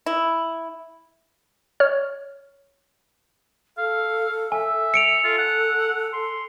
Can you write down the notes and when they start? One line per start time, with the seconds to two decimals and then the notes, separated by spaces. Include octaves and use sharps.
0.06 E4
1.80 C#5 F6
3.78 A4 F5
4.52 E5 G#5
4.94 C#7 D7 F7
5.24 F4 A4
5.38 F#5
6.13 C6